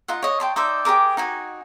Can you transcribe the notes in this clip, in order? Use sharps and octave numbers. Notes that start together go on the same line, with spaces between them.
D#4 F4 F#5
C#5 D#5
G5 A5 C6
D#4 C5 D5 E5
G4 G#4 A#4 D6
D#4 F#4 G#5